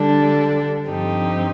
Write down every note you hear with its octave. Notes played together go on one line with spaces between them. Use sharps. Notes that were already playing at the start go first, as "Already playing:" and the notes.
Already playing: D3 G3 D4 A4
G2 F3 C4 D#4 G4